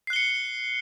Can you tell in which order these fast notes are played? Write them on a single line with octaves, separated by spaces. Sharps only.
C7 F#6 G7 C#7